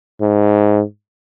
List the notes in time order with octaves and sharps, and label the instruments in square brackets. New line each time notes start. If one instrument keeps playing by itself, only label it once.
[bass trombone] G#2